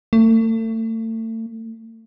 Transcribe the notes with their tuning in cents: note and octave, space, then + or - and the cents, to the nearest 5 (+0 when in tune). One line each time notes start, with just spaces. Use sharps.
A3 +35